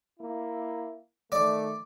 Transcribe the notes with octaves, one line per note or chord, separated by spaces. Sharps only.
A#3 E4
D#3 A3 D5